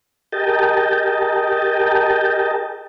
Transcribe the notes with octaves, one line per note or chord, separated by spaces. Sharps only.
G4 G#4 A#4 D#5 G5 A5